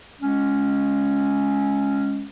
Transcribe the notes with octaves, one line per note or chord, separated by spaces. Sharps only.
G#3 C#4